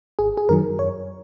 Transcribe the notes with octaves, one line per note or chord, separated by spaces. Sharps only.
G#1 G#4
G#4
F#2 D#3 F#3 A#4
F#2 C#5